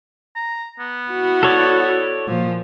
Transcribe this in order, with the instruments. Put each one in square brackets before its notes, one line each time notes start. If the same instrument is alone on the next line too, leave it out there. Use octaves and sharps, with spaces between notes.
[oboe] A#5
B3
[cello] E4 F#4
[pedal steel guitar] A4 C#5 D5
[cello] A#2 F3